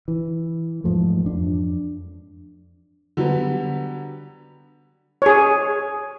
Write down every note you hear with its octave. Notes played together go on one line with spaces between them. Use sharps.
E3
E2 G#2 F3 A3
F2 D4
D3 F#3 G3 B3
G#4 C#5